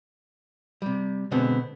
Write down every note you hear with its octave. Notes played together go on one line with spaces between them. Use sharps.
C3 G3
B2 D3 G#3 B3 C4